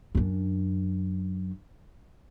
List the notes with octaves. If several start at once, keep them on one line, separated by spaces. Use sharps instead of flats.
F#2 D4